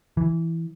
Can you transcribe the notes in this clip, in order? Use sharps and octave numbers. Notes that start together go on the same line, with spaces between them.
E3